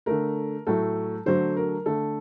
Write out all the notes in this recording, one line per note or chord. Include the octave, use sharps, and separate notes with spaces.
D3 A3 A#4
A2 F#3 A3 A4
D3 F#3 A3 C5
A#4
D3 A3 A4